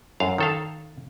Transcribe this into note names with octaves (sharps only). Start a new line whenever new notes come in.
F#2 F5
D#3 A4 F5